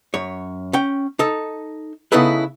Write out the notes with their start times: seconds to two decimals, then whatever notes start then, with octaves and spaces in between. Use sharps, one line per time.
0.14 F#2 C#5
0.73 C#4 G5
1.19 D#4 A4
2.12 C#3 B3 D#4 E4 A4 B4